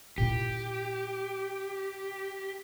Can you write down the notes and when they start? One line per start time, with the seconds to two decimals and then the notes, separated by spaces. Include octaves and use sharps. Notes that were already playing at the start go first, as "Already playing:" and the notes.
0.18 A#2 E4 G4